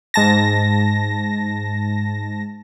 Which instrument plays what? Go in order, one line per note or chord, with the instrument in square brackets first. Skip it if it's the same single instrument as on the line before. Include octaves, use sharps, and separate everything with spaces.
[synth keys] G#2 A5 A#6